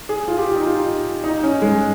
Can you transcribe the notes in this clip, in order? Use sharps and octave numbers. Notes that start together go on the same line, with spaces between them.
G#4
F4
G4
D#4
F4
D#4
C#4
G#3